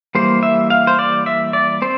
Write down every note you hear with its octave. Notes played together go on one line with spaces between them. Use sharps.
E3 G3 A#3 C5
E5
F5
C5
D5
E5
D5
C4 C5